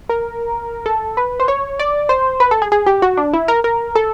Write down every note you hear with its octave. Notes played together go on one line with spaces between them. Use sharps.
A#4
A4
B4
C5
C#5
D5
C5
B4
A4
G#4
G#4
G4
F#4
D4
E4
A#4
A#4
A4